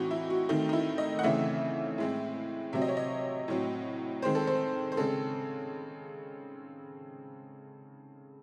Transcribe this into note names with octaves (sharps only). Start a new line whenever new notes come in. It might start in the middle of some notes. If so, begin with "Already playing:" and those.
Already playing: A2 E3 C4 D#4 F#4
E4
F#4
D#3 A3 C4 D#4
D#4
E4
D#5
F#5
C#3 E3 A3 C4 E5
A2 G#3 C4
C3 F#3 C4 E5
D#5
C#5
D#5
A2 F#3 C4
D#3 G#3 C4 C5
A4
C5
C5
C#3 G#3 C4 A4